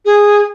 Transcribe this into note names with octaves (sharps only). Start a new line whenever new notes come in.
G#4